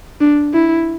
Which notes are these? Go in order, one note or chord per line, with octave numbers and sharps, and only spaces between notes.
D4
E4